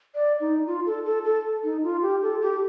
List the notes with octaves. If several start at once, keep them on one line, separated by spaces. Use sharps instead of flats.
D5
D#4
F4
A4
A4
A4
D#4
F4
G4
A4
G4